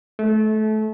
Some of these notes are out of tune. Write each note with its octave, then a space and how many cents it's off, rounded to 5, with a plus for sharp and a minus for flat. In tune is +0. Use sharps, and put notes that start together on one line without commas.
A3 -25